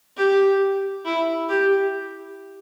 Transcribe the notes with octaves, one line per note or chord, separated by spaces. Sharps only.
G4
E4
G4